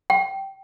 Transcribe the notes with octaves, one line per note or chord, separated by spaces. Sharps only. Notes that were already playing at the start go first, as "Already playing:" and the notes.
G5